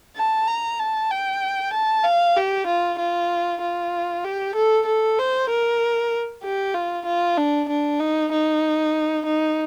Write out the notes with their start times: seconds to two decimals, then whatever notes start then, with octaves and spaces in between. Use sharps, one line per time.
0.16 A5
0.47 A#5
0.79 A5
1.10 G5
1.73 A5
2.04 F5
2.36 G4
2.67 F4
2.99 F4
3.61 F4
4.24 G4
4.55 A4
4.86 A4
5.18 C5
5.49 A#4
6.44 G4
6.74 F4
7.05 F4
7.37 D4
7.68 D4
8.00 D#4
8.31 D#4
9.25 D#4